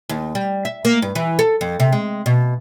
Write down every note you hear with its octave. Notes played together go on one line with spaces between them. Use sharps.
D#2
G3
E5
A#3
G2
E3
A4
F2
C3
G#3
B2